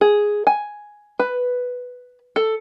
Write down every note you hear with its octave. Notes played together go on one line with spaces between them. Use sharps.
G#4
G#5
B4
A4